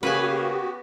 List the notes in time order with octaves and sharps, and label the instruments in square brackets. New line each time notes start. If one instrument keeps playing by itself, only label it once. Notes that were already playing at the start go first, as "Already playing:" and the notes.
[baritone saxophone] C#3 [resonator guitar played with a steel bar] A#3 [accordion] B3 F#4 G4 [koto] B4 G#5